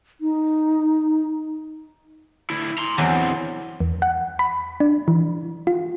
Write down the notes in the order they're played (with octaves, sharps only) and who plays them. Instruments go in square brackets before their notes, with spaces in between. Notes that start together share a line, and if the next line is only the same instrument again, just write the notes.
[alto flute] D#4
[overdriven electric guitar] D2 E4
A#5 C6
[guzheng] E2 F#3 [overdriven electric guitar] D3 C4
[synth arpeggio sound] E2
F#5
B5
D4
E3
F4